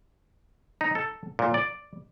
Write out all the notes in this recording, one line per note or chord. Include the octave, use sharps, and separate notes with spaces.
D#4
A4
A#2
D5